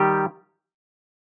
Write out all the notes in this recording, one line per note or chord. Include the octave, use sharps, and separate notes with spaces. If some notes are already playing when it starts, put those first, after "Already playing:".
Already playing: D#3 G3 G4